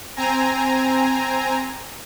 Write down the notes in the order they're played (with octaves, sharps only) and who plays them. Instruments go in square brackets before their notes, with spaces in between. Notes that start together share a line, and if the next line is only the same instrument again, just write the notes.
[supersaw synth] C4 G#5 A#5